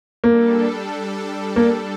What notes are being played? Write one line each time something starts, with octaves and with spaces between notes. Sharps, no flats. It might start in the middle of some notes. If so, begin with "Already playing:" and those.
G3 A#3 D4 A4
A#3